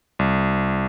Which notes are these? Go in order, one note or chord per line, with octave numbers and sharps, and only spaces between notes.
C2